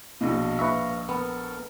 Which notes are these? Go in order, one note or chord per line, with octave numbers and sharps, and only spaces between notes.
A#1 B2 D#5 F5
A#1 B4 E5 C#6
B3 A4 A#4